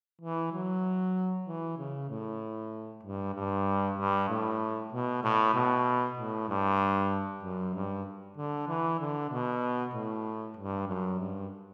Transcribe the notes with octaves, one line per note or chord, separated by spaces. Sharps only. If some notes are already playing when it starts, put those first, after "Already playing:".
E3
F#3
E3
C#3
A2
G2
G2
G2
A2
B2
A2
B2
A2
G2
F#2
G2
D3
E3
D3
B2
A2
G2
F#2
G2